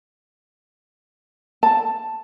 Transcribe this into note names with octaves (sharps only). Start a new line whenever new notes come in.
A5